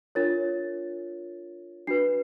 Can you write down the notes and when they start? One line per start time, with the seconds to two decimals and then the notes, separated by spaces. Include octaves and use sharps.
0.15 D4 F4 A#4 C#5 A6
1.87 D4 F#4 B4 C7